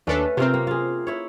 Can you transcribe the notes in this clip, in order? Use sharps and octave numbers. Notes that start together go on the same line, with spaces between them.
D#2 A3 C#4 D4 A4 B4
C3 C4 F4 A#4
A#3
F4 G#4
E4 C#5